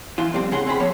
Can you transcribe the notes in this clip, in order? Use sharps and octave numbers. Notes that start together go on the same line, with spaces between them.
E3 F4
F2 G3 C4
C#3 C#4 G#4 F#5 C6
C4 G#4 C5 B5
F3 A#3 C#5